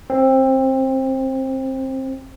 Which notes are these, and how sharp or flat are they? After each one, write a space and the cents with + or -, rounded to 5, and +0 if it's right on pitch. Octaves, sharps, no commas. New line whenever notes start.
C4 +20